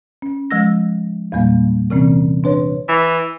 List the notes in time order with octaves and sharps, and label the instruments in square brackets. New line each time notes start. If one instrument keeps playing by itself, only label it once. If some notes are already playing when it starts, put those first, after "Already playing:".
[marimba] C#4
F3 G#3 E6 A#6
E2 A#2 G3 A#3
C3 E3 C4 C#4
D4 B4 C#5
[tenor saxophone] E3